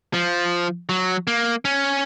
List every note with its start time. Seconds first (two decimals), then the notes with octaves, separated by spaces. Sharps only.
0.14 F3
0.89 F#3
1.27 A#3
1.65 C#4